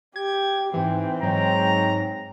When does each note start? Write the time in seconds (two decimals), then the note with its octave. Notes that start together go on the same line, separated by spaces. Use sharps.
0.16 G4 G#6
0.74 G#2 E3 C4
1.23 G#2 F#3 A#5